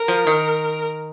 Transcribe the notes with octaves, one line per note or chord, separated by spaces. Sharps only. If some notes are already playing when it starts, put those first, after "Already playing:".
Already playing: A#4
F3
D#3